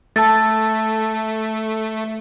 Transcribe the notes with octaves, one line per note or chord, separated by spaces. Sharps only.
A3 A5 E6 A6